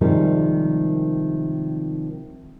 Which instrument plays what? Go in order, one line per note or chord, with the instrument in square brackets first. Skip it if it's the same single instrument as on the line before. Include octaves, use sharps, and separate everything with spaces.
[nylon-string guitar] C3 D#3 F3 G3 G#3 C#4